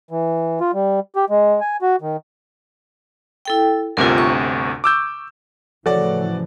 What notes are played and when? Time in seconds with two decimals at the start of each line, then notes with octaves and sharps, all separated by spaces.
0.11 E3
0.60 F4
0.74 G3
1.16 G4
1.30 G#3
1.61 G#5
1.82 F#4
2.02 D#3
3.45 E4 A4 G5
3.97 G1 D2 C3 F4 A#4
4.18 C#6
4.84 D6 E6 G6
5.86 A2 C#3 E3 F3 F#4 A4 C#5 D5